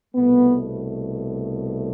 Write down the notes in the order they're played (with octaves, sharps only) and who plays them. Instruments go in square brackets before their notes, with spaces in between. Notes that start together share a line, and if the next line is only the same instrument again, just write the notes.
[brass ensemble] C2 B2 A3 B3